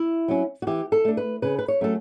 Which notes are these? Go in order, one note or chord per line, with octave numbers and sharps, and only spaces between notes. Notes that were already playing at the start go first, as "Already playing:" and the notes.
Already playing: E4
F#3 C#4
F#4
E3 G4
A4
A3 D4
B4
C#3 B4
B4
C#5
F#3 A3 C#4 A4